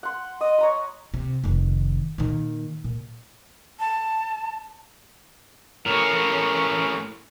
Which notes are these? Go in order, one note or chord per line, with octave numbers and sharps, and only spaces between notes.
F#5 C6
D#5 D#6
C#5 A#5 B5
C3
F1 D#3
A#2 D#3
A#2
A5
A2 C#4 A#4